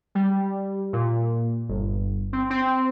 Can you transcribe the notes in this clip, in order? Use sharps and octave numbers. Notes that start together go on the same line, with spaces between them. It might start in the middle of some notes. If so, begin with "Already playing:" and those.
G3
A#2
G1
C4
C4